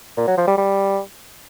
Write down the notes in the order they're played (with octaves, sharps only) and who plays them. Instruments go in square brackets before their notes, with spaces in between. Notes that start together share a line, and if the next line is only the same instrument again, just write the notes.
[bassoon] A#2
F#3
F3
G3
G3